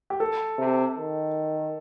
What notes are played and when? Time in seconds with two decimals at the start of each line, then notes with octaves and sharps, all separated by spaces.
0.10 G4
0.20 A4
0.58 C3
0.97 D#3